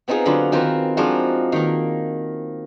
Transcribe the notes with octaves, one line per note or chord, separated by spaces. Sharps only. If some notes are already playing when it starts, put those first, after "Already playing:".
B3 C4 D#4 F4 G#4
D3 F#3 F4 B5
D#3 C4 F4 A#4 B4
F3 G#3 D4 D#4 F4 F#4
D#3 A#3